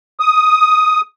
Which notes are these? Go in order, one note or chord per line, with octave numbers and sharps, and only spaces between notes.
D#6